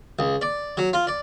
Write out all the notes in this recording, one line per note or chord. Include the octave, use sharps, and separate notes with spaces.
C#2
D5
F#3
F4
D5